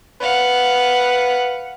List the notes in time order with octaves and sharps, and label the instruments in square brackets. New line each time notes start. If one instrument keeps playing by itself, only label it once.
[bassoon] B4 [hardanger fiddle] F5 F#5